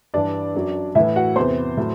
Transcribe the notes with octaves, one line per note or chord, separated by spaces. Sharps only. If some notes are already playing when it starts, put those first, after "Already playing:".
G2 E3 D4 D5
F#2 F#3
A2 E3 E4 E5
F#4 F#5
E2 C3 E3 C5 C6
A2 F#3